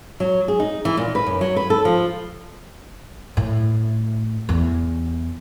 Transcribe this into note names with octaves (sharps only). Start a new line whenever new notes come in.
F#3
G#4
D#4
E3
A#2
B4
F#2
F#3
B4
A4
F3
A2
E2